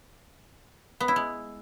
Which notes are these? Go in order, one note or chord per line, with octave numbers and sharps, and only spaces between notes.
B3
E4
G#3